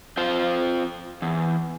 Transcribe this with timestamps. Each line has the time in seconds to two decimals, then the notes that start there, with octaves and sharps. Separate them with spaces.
0.17 C4 F4 C5
1.22 E2